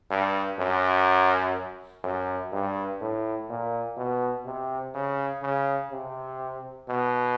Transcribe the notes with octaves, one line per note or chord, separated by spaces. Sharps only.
G2
F#2
F#2
G2
A2
A#2
B2
C3
C#3
C#3
C3
B2